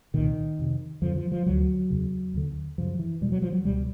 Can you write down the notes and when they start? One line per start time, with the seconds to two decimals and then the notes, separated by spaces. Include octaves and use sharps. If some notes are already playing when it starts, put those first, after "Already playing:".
0.14 C2 A#2 D#3
0.59 F2 C3
1.02 F2 D3 F3
1.16 F3
1.32 F3
1.46 D2 D3 F#3
1.90 E2 C#3
2.34 D#2 D3
2.78 F#2 C#3 F3
2.99 E3
3.21 E2 B2 G3
3.32 F#3
3.42 F3
3.53 F#3
3.65 C#2 B2 G3